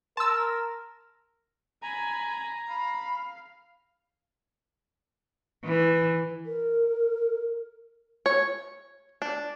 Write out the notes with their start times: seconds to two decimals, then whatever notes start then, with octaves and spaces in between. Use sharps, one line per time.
0.17 A#4 A5 C6 E6
1.82 G#5 A#5 B5
2.69 F5 B5
5.65 E3
6.46 A#4
8.26 C#5
9.22 D4